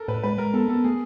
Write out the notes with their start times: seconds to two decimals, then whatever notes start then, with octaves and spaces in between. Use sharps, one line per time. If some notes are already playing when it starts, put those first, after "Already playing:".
Already playing: A4 A#4
0.08 A2 B4
0.23 G#3 B4
0.38 G#3 A#4
0.53 B3 A4
0.68 B3 A4
0.84 A3 G#4